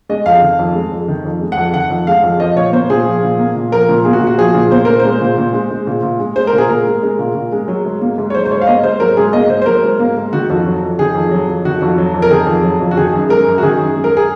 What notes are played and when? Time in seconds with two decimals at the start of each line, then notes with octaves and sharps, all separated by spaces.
0.09 G#3 D#5
0.26 F2 F5
0.42 D#3
0.59 F2
0.75 G#3
0.91 F2
1.08 D#3
1.25 F2
1.41 G#3
1.52 F#5
1.57 F2
1.74 D#3 F#5
1.90 F2
2.07 G#3 F5
2.23 F2
2.40 F3 D#5
2.56 A#2 C#5
2.73 A#3 C5
2.90 A#2 G#4
3.06 F3
3.23 A#2
3.39 A#3
3.55 A#2
3.72 F3 A#4
3.89 A#2
4.05 A#3 G#4
4.13 F#4
4.21 A#2
4.27 F#4
4.38 F3 G#4
4.55 A#2
4.71 A#3 C5
4.85 A#2 A#4
5.00 C5
5.05 G#3
5.21 A#2
5.38 A#2
5.53 G#3
5.71 G#3
5.87 A#2
6.03 A#2
6.20 G#3
6.36 G#3 C5
6.47 A#4
6.53 A#2
6.58 G#4
6.69 A#2 A#4
6.86 G#3
7.03 G#3
7.19 A#2
7.35 A#2
7.52 G#3
7.68 F#3
7.85 G#2
8.01 A#3
8.18 G#2
8.30 C#5
8.35 F#3 C5
8.45 C5
8.51 G#2 C#5
8.61 F5
8.67 A#3 D#5
8.83 G#2 C5
9.00 F#3 A#4
9.17 G#2 G#4
9.33 A#3 D#5
9.49 G#2 C5
9.62 C5
9.66 F#3 A#4
9.83 G#2
9.99 A#3
10.16 G#2
10.33 D#3 F#4
10.50 F2 F#4
10.66 F#3
10.83 F2
10.99 D#3 G#4
11.15 F2
11.31 F#3
11.48 F2
11.65 D#3 F#4
11.81 F2 F#4
11.98 F#3
12.14 F2
12.22 A#4
12.30 D#3 G#4
12.47 F2
12.63 F#3
12.80 F2
12.91 F#4
12.97 D#3 G#4
13.14 F#2
13.29 G#3 A#4
13.47 F#2
13.58 F#4
13.63 D#3 G#4
13.79 F#2
13.95 G#3
14.04 A#4
14.17 G#4